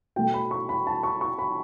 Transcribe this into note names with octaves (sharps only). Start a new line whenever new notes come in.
B2 A3 G5
B5
C#6
B5
A5
C#6
C#6
B5